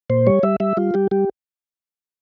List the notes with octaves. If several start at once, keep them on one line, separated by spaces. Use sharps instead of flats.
A#2 C5
G3 C#5
G3 E5
G3 E5
G3 F4
G3 G4
G3 G4